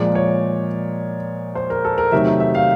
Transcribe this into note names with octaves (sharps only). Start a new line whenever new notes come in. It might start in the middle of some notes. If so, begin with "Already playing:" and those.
Already playing: A#2 F3 G#3 D5
C#5
C5
A#4
A4
A#4
C3 D#3 F#3 A3 E5
E5
E5
F5